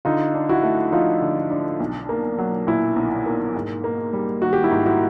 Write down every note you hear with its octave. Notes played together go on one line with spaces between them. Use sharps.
D3 D#4 F4
D4
E4 F#4
A3
F3 D#4 F4
D3
D4
B1
A#3
F#3
A#2 E4
B1
A#3
G#2
A#3
G3
D#3 F#4
G4
E4 F#4
G#2
E4 F#4